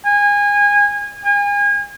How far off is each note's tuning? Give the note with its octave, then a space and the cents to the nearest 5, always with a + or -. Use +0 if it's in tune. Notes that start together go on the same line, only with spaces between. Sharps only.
G#5 -25
G#5 -35